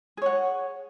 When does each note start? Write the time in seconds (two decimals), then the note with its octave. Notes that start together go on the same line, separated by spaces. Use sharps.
0.17 G#4
0.22 C#5
0.26 F#5